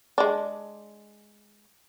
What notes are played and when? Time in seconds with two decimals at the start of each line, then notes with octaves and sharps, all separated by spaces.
0.18 G#3 D4